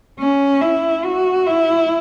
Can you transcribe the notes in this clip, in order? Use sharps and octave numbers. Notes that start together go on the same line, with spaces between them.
C#4
E4
F#4
E4